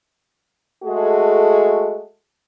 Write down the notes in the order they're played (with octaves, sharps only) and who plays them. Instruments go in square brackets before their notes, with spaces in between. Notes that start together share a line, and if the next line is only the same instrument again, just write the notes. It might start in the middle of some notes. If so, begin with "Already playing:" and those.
[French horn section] G#3 A3 F#4 G#4 A4